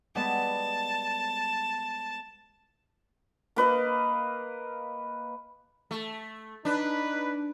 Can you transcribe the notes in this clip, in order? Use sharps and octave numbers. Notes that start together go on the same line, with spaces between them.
G3 G#3 B3 A5
A#3 B4 D#5 F5
A3
D4 D#4 B4